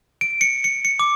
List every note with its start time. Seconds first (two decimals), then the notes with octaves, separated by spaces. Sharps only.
0.21 D7
0.41 C#7
0.64 C#7
0.85 C#7
0.99 D6